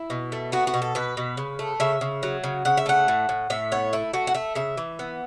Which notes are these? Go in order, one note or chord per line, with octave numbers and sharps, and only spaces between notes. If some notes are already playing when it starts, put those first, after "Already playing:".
Already playing: E4
B2
A3
B3 F#4
F#4
B2
A4
B2 B4
B2
C#3
A3
C#3 E5
C#3
F#3
C#3
C#3 F#5
E5
A3 F#5
A2
A2
A2 E5
B3 C#5
A3 E4
A3 F#4
F#5
A3 E5
C#3 E5
E3
B3